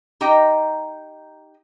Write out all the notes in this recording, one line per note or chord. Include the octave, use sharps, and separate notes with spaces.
D#4 G4 D#5 G5 A#5